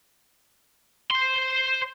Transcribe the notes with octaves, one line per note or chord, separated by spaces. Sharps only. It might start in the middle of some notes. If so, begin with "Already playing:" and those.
C5 C6